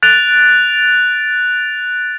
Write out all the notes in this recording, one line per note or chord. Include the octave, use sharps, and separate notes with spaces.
F#6 A6 D7 F7